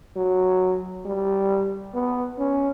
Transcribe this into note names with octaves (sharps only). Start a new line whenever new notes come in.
F#3
G3
B3
C#4